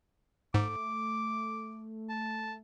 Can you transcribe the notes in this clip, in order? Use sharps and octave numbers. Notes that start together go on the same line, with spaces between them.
G#2 A3 D6
A5